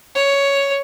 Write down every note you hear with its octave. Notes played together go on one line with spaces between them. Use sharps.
C#5